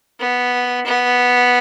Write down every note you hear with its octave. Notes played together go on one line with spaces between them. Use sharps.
B3
B3